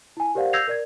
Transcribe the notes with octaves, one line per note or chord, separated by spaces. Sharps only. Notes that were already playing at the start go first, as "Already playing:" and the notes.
E4 G#5
G4 A#4 C5 D5 F5 F#5
E6 G6 G#6 A#6 C7 F7
A#4 D5 G#6